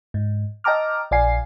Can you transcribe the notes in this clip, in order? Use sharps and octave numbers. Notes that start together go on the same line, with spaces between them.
G#2
D#5 G5 A5 A#5 D6 F6
A#1 D5 F5 G#5 C7